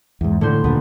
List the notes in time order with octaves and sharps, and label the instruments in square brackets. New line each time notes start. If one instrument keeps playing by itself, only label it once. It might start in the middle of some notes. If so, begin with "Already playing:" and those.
[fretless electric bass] E2 G#2
[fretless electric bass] A2 [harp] D3 C5
[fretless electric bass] D#2 A#2 D3 [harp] B3